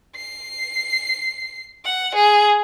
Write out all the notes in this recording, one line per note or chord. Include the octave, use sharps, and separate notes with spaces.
C7
F#5
G#4